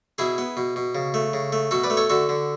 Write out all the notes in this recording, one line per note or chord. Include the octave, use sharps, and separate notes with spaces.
B2 E4 G#4
B3
B2
B2
C#3
A3
C#3
A3
B2 F#4 A4
B4 D5
A3
A4 C#5
D3 F#4 A4
D3